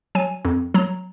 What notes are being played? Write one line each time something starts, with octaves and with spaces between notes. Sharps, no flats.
F#3 G#5
F2
F#3 A#5